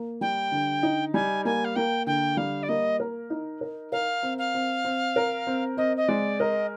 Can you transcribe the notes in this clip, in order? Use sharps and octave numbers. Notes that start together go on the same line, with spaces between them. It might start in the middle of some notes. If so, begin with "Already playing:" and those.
Already playing: A#3
G3 G5
D3
D#4
G3 G#5
A#3 G#5
F5
A#3 G5
D3 G5
G3 F5
D5
A#3 D#5
A#4
D#4
A#4
A#4 F5
C4
F5
C4
C4
A#4
C4
C4 D#5
D#5
G#3 D5
A#4 D#5